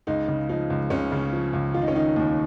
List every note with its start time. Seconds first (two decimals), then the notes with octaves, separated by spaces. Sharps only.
0.07 C#2 D#4
0.28 C#3
0.49 F3 D#4
0.70 C#2
0.90 C#2 C#4
1.12 C#3
1.33 F3
1.53 C#2
1.74 D#3 F4
1.82 D#4
1.88 C#4
1.95 D#3 D#4
2.16 D#2